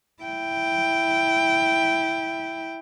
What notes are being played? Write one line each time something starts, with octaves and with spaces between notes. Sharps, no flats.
E4 G5